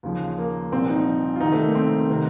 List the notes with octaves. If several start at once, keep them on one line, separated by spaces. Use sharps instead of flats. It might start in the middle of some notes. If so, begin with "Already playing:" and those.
D#2 C#3 F3
A#3
C2 A#2 F3 C4
D#4
F4
C2 C3 D#3 D#4
A3
A#3
C4
C3 D#3